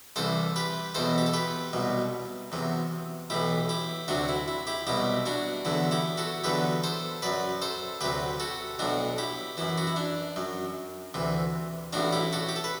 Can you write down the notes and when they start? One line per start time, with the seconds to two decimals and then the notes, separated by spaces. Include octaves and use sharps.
0.16 C2 C3 E3 A4 C5
0.56 G4 B4
0.95 E2 B2 F#3 A4 C5
1.18 G4
1.26 A4
1.34 G4 B4
1.73 C2 B2 F#3
2.52 E2 C3 F#3
3.30 B1 A2 E3 E4 G4
3.69 E4 G4
4.08 D2 C3 F#3 D4 F#4
4.29 E4
4.48 E4
4.67 E4 G4
4.87 C2 B2 F#3 E4 G4
5.26 D4 F#4
5.65 E2 D3 F#3 E4
5.91 E4 G4
6.17 F#4 A4
6.44 E2 D3 F#3 G4 B4
6.84 A4 C5
7.22 F#2 F#3 B4 D5
7.62 A4 C5
8.01 D2 C3 F#3 G4 B4
8.40 F#4 A4
8.79 B1 A2 F#3 D4 F#4
9.18 E4 G4
9.57 F#2 E3 E4
9.78 F#4
9.87 E4
9.96 D4
10.36 F#2 F#3
11.14 D2 C3 E3
11.93 A1 A2 F#3 D4 F#4
12.13 E4 G4
12.33 F#4 A4
12.49 G4
12.56 A4
12.64 B4